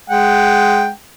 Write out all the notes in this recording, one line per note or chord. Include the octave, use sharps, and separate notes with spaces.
G#3 F#5 G5